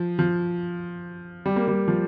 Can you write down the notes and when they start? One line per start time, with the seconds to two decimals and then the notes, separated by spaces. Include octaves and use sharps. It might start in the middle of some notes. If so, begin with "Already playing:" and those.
Already playing: F3
0.19 F3
1.46 G3
1.56 A#3
1.68 G3
1.88 F3